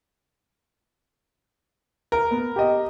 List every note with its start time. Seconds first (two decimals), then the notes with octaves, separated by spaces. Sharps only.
2.12 A#4
2.31 B3
2.56 G4 D#5